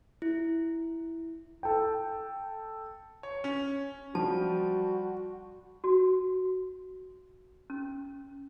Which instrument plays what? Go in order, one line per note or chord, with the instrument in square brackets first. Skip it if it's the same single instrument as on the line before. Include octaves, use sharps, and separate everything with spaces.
[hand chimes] E4
[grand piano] A4 G5
[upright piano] C#5
C#4
[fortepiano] F3 [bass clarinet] G3 [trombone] F#4 [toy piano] A5
[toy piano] F#4
C#4